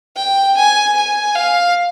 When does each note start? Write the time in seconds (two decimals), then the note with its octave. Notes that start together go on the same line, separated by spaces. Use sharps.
0.16 G5
0.57 G#5
0.97 G#5
1.35 F5